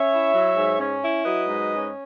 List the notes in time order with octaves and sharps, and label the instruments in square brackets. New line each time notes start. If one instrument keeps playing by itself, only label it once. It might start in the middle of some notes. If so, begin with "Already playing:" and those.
Already playing: [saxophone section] C#4 C#5 E5
E4
F#3
G#2
C#4
E4
F#3 B4 D#5
G#2
C#4